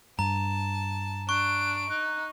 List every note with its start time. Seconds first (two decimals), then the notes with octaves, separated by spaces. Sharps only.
0.19 G2 A5 A#5
1.29 D4 C#6 F#6 D7
1.90 D#4 F#6